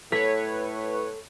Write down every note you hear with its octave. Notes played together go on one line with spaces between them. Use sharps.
A2 A4 B4 C#5 B6